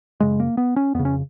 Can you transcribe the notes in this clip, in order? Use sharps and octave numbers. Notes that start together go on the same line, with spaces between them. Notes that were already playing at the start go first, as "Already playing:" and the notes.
F#2 C#3 G#3
A#3
B3
C#4
F2 C#3 B3
C#4